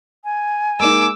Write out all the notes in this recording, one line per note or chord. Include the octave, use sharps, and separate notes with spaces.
G#5
G#3 A#3 D#4 D6 E6